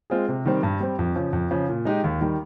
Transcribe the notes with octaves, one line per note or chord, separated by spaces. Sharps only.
G#3 C4 F4 G#4
C3
D#3 G3 C4
G2
G3 C4
F2
C#3 F3
F2
C#3 F3
A#2
G#3 D#4 G4
D#2
D#3 G3